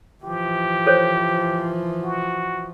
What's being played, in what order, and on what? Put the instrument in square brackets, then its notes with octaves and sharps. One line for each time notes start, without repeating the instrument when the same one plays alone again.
[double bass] E3 F3 [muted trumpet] G4
[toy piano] A4 C5 C#5
[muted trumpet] F#4